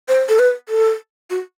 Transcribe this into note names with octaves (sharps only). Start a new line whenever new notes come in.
C5
A4
B4
A4
F#4